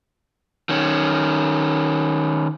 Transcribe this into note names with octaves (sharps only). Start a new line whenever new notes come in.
D#3 C#4